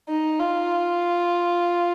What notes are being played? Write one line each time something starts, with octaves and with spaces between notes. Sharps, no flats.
D#4
F4